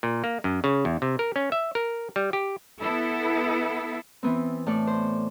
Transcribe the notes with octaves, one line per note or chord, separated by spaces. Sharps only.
A#2
A#3
F#2
C#3
E2
C3
A#4
C#4
E5
A#4
G3
G4
B3 E4 A4
E3 B3 C4
A2 A4 D5
C5